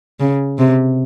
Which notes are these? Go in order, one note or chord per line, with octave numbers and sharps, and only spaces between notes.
C#3
C3